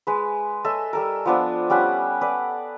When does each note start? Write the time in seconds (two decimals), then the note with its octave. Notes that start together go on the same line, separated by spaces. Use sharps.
0.07 G#3 B4
0.65 A4 C#5 D#5 E5
0.93 G3 A4 A#4
1.26 F3 B3 D4
1.70 G3 C#4 F#5 B5
2.21 A4 B4 D5